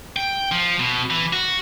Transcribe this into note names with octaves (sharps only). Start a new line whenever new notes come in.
G5
F3
B2
E3
F#4